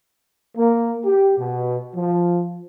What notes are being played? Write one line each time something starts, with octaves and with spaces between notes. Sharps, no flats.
A#3
G4
B2
F3